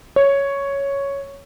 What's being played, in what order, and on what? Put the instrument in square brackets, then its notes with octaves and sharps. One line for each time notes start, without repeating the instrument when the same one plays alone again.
[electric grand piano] C#5